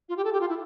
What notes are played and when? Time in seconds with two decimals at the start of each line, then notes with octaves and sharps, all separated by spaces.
0.09 F4
0.17 G4
0.25 A4
0.33 G4
0.41 F4
0.49 E4